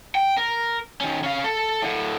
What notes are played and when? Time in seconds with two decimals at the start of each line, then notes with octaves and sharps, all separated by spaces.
0.15 G5
0.37 A#4
1.01 D#3 C#4
1.24 C#4 F5
1.44 A4
1.82 A2 D3